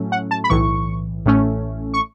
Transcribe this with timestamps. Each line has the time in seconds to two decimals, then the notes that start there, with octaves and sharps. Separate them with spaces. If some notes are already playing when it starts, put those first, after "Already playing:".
Already playing: A2 F#3 A3 C#4
0.12 F#5
0.31 A5
0.44 B5
0.50 B1 A2 E3 C#6
1.26 A1 A2 A3 C#4
1.94 C#6